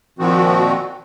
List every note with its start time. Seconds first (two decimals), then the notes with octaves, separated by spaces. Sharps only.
0.19 A#2 D#3 F3 C4 F#4